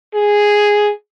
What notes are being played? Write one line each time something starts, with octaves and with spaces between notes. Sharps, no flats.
G#4